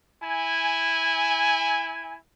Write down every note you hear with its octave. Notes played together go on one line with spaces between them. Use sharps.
E4 G#5